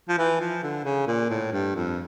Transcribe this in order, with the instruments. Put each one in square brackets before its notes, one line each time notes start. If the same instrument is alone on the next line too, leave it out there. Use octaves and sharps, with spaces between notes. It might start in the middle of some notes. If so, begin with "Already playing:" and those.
[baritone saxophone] F3
E3
F3
D3
C#3
A#2
A2
G2
F2